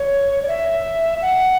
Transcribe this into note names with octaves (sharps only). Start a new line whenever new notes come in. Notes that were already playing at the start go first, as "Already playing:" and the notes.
Already playing: C#5
D5
E5
F#5